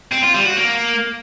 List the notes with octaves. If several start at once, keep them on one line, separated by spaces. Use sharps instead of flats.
C4
F4
G3
F#4
A#3